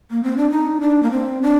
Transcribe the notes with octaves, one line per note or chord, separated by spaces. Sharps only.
A#3
C4
D4
D#4
D4
A#3
C4
D4